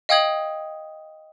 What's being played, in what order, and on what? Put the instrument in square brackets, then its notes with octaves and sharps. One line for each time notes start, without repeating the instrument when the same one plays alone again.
[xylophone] D#5 F5 G5 D#6 G#6 F#7